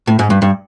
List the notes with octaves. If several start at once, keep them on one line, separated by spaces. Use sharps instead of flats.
A2
G#2
G2
G2